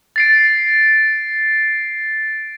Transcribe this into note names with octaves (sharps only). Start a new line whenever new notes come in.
A6 C7 D7